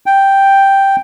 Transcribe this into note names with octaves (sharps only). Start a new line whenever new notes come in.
G5